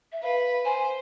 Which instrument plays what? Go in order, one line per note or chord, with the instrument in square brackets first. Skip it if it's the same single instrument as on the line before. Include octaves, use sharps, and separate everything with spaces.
[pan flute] E5
[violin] B4 [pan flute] F5
[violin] C5 [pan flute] G#5